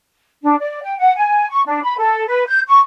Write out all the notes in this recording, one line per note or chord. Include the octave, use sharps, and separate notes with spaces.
D4
D5
G5
F#5
G#5
C#6
D4
B5
A4
B4
G6
C#6